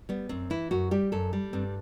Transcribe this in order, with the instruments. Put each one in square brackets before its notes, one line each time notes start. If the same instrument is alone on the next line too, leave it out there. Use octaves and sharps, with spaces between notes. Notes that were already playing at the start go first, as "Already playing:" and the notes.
[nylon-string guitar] G3 B3
F#2 C4
E3 E4
F#2 F#4
G3 G4
F#2 A4
G3
G2 C4